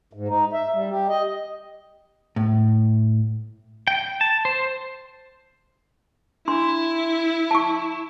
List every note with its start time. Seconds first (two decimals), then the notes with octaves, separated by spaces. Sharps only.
0.13 G#2
0.28 D#4
0.53 E5
0.73 G3
0.90 G4
1.08 D#5
2.36 A2
3.87 G5
4.21 A5
4.45 C5
6.48 D4 E4 C6
7.51 A5 C#6